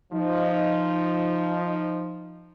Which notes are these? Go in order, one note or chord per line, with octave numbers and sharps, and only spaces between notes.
F3 D#4